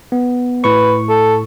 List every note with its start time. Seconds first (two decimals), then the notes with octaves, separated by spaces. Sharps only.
0.12 B3
0.64 A2 B4 C#6
1.09 A4